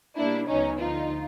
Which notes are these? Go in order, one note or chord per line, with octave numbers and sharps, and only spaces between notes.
B2 G3 A#3 D4 E4
C#2 C#3 F#3 B3 C#4 D#4
D2 D3 F3 D#4 F4